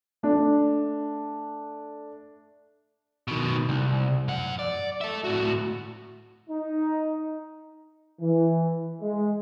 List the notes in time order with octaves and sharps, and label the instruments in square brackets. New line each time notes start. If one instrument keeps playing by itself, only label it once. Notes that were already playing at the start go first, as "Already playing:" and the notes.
[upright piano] A3 D4
[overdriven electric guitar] B2 D#3
C2
F#2 F#5
D5
A4 E5
A2 F#4
[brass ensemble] D#4
E3
G#3